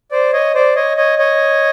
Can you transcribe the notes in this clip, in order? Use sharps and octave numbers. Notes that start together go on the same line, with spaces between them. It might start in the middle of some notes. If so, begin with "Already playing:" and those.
C5 D5
C#5 D#5
C5 D5
C#5 D#5
C#5 D#5
C#5 D#5